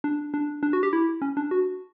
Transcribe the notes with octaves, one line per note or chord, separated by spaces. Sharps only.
D4
D4
D4
F#4
G4
E4
C#4
D4
F#4